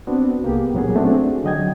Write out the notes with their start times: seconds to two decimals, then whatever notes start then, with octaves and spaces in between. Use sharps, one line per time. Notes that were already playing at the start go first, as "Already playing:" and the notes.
0.07 B3 C4 D4 F#4
0.43 C2 A#3 B3 G4 G#4
0.74 A#2 F#3 B3 C#4 F#4 G#4
0.96 A3 C4 D4 F#4 G#4
1.44 D3 F#3 D#5 G5 G#6